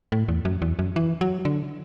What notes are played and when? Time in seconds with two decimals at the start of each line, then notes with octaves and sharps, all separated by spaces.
0.12 A2
0.28 E2
0.45 F#2
0.62 E2
0.79 F#2
0.96 E3
1.21 F#3
1.45 D3